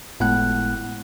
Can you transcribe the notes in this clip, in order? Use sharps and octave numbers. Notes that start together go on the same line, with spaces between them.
G1 A2 G#3 B3 F#5 F#6